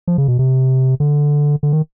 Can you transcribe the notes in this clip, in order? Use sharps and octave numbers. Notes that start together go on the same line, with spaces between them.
F3
C#3
B2
C3
D3
D3
D#3